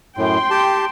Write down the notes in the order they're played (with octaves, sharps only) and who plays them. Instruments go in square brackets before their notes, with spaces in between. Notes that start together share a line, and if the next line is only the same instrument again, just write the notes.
[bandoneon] F#2 A2 [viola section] G5 C6
[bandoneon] G4 A5